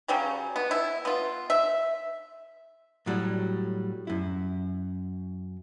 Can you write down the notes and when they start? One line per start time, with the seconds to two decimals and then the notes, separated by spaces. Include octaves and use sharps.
0.08 C#3 F#3 G3 C#4
0.56 B3
0.71 E4
1.05 B3 F4
1.50 E5
3.06 A2 F#3 G3
4.07 F#2 E4